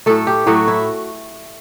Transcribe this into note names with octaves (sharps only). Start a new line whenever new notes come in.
A2 F#3 A3 A4
G4
A2 F#3 A3 F#4
E4